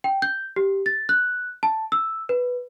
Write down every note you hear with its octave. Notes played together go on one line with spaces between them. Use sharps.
G5
G6
G4
A6
F#6
A5
E6
B4